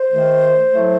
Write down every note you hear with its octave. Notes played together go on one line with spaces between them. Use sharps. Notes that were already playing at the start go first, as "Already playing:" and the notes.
Already playing: C5
D#2 D#3 A3
A2 F#3 A3